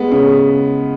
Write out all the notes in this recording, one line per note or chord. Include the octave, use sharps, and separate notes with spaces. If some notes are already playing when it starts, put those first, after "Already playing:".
Already playing: G#3 B3
C#3